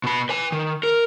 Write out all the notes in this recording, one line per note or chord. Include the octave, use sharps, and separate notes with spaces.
B2 B5
B4 G#5
D#3
A#4